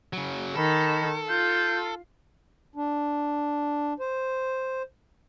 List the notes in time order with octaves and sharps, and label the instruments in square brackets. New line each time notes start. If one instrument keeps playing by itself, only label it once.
[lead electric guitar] C#3 F#3
[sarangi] D#3 [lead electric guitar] A4 [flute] B5
[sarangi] F4 [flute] G6
[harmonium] D4
C5